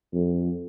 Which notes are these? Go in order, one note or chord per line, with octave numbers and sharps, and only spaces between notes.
F2